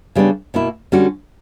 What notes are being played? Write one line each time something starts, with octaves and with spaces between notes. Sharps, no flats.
C#3 G3 B3 D4
B2 A#3 E4
D3 G3 C#4 F#4